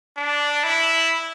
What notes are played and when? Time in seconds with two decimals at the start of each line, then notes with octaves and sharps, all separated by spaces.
0.17 D4
0.64 E4